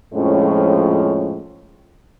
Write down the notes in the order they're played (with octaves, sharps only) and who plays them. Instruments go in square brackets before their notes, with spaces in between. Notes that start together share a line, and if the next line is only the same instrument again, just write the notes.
[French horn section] F2 A2 F3 G#3 C#4